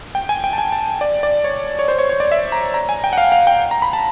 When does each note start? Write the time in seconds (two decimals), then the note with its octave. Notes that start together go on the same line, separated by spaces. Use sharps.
0.15 G5
0.29 G#5
0.44 G5
0.53 A5
0.58 G#5
0.72 A5
1.01 D5
1.23 D5
1.44 C#5
1.79 C#5
1.88 C5
1.99 C#5
2.09 C#5
2.20 D5
2.32 E5
2.52 A#5
2.74 A#5
2.89 G#5
3.04 G5
3.13 F#5
3.18 F5
3.32 F5
3.47 G5
3.71 A#5
3.82 B5
3.93 A5